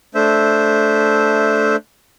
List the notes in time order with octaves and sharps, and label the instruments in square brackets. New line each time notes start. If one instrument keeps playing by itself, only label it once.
[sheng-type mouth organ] A3 D4 C5 E5